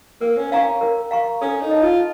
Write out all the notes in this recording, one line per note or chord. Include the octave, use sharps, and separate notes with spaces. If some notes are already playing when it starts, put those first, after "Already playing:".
A#3 A#4
C#4
C#4 F5 A#5 C#6
A#4
F5 A#5 C#6
C#4 A4
D#4
D#5 A5
F4